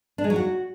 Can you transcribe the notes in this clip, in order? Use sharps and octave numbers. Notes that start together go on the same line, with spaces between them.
D4
G#3
F#3
F#4